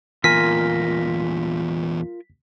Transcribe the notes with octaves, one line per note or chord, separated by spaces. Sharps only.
E2 A#2 F4 A#4 G#5 B6